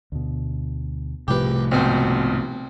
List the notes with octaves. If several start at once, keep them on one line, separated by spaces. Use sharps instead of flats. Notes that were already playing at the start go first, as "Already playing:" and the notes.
D2 B2
C2 A2 C3 F3 G4 B4
G#1 B2 C4 C5